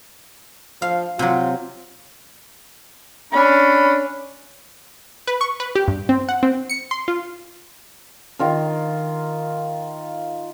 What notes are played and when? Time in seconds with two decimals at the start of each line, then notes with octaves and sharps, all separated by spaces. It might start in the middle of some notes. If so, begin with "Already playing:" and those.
0.82 F3 F5
1.19 C3 F#3 F4
3.33 C#4 D4 B5
5.27 B4
5.41 C#6
5.60 B4
5.75 G4
5.88 G2
6.09 C4
6.29 F#5
6.43 C4
6.70 C#7
6.91 C6
7.08 F4
8.39 D#3 F4 A#4